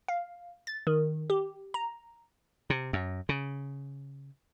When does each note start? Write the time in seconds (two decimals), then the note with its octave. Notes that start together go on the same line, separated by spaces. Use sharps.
0.08 F5
0.67 A6
0.87 D#3
1.30 G4
1.74 A#5
2.70 C3
2.93 F#2
3.29 C#3